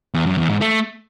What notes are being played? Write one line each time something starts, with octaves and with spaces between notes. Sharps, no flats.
E2
F#2
E2
G#2
A3